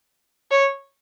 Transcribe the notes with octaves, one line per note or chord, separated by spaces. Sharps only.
C#5